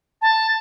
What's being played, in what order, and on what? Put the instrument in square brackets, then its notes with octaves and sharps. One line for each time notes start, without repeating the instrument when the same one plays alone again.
[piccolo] A5